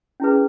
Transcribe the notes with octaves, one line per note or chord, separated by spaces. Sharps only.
C#4 E4 G#4 B4